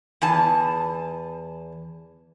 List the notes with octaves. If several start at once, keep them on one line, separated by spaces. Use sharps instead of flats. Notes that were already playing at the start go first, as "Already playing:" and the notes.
E2 G#5 A5